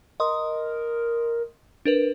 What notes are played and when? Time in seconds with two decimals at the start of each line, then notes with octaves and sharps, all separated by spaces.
0.20 A#4 D#5 C6 D#6
1.85 D4 A#4 B4